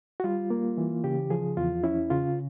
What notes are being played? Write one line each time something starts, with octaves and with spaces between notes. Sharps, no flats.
F#4
G3 F4
A#3
E3
C#3 G4
F3 G#4
E2 F4
C#4 E4
C#3 F4